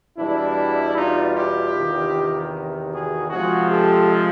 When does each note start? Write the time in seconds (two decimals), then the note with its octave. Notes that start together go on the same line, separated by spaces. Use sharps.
0.18 E2 B2 G3 D4 E4
0.96 D#4 F4
1.35 F4 G4
1.74 E2 C3 D#3
2.91 F#4 G#4
3.30 C3 F3 G#3 F#4 G#4
3.69 G4 A4